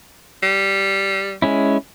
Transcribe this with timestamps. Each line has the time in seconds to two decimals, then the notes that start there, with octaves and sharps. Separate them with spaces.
0.43 G3
1.42 G#3 C#4 E4